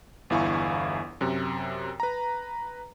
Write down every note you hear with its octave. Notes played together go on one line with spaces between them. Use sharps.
G1 E2 E4 F5 G#5 C#6
F#2 C3
B4 A#5